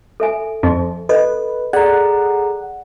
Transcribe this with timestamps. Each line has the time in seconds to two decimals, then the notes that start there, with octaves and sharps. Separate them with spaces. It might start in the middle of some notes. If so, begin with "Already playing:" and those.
0.20 A4 E5 G#5
0.63 F2
1.09 A4 B4 D#5
1.73 G#4 A4 D5 F#5 A#5